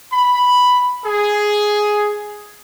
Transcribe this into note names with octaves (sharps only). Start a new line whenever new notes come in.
B5
G#4